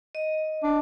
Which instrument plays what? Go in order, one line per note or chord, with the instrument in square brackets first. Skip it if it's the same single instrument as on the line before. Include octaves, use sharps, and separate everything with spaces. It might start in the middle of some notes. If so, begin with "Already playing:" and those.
[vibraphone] D#5
[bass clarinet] D4